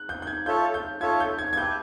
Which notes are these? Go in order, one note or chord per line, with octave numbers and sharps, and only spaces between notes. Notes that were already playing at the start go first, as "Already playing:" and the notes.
Already playing: F#6
G6
G6
G#6
F4 A4 C#5 E5 A5 G6
G6
F4 A4 C#5 E5 A5 G#6
G6
G#6
G#6
G4 B4 E5 A5 G6